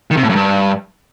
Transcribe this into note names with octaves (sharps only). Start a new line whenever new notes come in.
D#3
C3
A2
F#2
G2